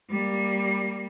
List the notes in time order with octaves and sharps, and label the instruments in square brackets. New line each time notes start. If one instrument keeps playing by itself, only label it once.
[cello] G3 A#3